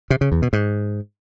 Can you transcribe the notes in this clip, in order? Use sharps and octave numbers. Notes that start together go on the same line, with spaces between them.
C3
C#3
E2
B2
G#2